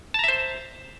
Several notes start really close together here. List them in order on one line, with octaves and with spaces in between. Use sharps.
A5 A#5 E5 C5